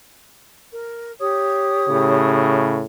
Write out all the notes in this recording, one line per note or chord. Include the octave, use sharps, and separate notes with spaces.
A#4
G4 C#5 D#6
A2 C#3